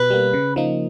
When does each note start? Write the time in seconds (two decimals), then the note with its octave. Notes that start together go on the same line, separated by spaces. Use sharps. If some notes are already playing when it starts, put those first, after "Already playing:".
Already playing: B2 B4
0.10 G3 A#3
0.33 C#3
0.56 F3 A#3 D#4